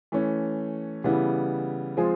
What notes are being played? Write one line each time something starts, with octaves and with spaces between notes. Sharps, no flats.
E3 A3 C#4
C#3 E3 G3 B3 E4
F3 G#3 C4 F4 G#4